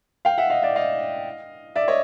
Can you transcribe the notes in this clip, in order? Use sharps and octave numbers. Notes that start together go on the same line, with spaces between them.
F5 G5
E5 F#5
D#5 F5
D5 E5
D#5 F5
D5 E5
C#5 D#5